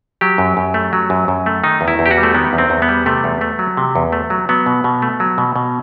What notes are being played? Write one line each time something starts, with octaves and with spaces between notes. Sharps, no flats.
F#3 G4
F#2
F#2
A3
F#3
F#2
F#2
A3
D#3 D#4
E2
E4
E2
G4
F#4
G3
A3
D#3 B3
E2
C4
E2
B3
G3
C3 A3
E2
A3
F#3
C3
E2
A3
F#3
F#3 B3
B2
B2
A3
F#3
B2
B2